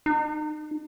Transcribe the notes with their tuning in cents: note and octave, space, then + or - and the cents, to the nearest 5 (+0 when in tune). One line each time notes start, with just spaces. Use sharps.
D#4 -30